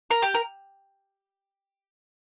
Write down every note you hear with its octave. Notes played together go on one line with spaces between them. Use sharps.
A#4
G4
A#4